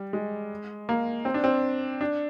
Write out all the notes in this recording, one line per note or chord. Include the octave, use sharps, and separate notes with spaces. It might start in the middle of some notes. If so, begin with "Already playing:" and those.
Already playing: G3
G#3
A#3
C4
D4
C4
D4